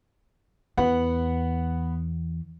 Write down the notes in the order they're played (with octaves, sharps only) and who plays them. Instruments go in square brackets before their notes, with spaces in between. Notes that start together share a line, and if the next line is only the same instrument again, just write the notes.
[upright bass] E2 [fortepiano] B3 F#5